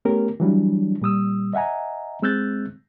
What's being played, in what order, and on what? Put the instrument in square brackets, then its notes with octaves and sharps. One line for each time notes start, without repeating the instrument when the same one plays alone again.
[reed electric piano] A3 B3 C#4 G4 A#4
E3 F#3 G3 D4
A#2 G3 D#6 E6
D#5 E5 F#5 G#5 A#5
G#3 C4 E6 F#6 G6 A6